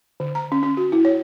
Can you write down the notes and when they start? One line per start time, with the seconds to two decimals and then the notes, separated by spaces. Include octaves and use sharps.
0.20 D3
0.35 A#5
0.52 C#4
0.63 C#4
0.77 F#4
0.92 E4
1.05 C#5